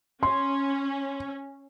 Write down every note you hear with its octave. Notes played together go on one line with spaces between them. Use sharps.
C#4 C6